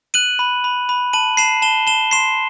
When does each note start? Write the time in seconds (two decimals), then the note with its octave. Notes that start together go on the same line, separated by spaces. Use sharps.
0.14 F#6 D#7 F#7
0.39 B5
0.64 B5
0.89 B5
1.13 A5 D#7 F#7
1.37 A5 C7 E7
1.62 A5 E7 G7
1.87 A5 E7 G7
2.11 C6 C7 E7